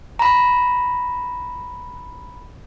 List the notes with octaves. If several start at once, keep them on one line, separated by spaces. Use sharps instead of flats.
A#5 B5